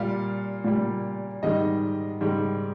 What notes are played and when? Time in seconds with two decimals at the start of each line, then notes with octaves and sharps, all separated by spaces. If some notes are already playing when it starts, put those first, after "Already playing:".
Already playing: A#2 G3 F5
0.64 A#2 G3
1.43 G#2 D#3 G3 D#5
2.21 G#2 D#3 G3